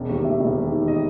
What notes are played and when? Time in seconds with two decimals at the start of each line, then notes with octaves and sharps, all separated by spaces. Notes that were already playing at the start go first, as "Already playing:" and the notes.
Already playing: E1
0.09 D#2
0.25 E1 E5
0.40 E1
0.56 D#2
0.72 D#3
0.88 D#5